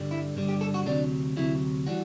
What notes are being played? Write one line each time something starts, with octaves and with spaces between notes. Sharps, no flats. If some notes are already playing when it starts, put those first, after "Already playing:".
Already playing: G2 D3 G3
E4
G2 D3 G3
G4
A4
F#4
D2 C3 F#3 D4
D2 C3 F#3 E4
E3 G3 F#4